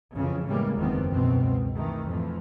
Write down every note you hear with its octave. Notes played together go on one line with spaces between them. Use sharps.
F2 C#3 E3
A2 C#3 E3 G3 G#3 A#3
F#1 E2 D#3 F3 B3 C4
C#2 F#2 B2 C4
D#3 E3 A3
F2 A2 E3 F3